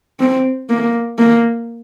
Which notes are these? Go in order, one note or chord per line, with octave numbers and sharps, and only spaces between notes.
C4
A#3
A#3